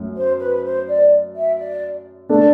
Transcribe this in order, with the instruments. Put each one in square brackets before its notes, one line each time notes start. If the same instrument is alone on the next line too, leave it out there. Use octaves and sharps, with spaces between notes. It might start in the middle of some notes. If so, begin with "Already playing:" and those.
Already playing: [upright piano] F#2 F#3 A3
[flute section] C5
B4
B4
C5
D5
E5
D5
[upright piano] A3 D4 A4 [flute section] D5